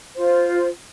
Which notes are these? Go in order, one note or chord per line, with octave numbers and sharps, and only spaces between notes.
F4 C5